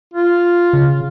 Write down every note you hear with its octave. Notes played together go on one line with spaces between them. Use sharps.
F4
C#3